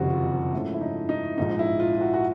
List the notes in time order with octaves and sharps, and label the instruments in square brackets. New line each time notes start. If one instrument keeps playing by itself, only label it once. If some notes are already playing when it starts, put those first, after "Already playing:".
Already playing: [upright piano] F#1 F2 C3 D#3 G3 F#4
F4
G#2 F3 A3 C#4 E4
E4
D#4
D#4
A#1 G#2 F3 D#4
E4
F4
F4
F#4
F#4